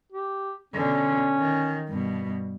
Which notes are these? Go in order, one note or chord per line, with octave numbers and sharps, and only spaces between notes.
G4
B2 D3 C#4
D#3
G2 B2